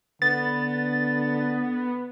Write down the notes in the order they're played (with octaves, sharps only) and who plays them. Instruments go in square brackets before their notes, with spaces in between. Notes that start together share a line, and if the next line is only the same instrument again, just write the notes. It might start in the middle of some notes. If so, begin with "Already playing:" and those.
[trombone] D3 [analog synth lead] B3 [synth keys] A6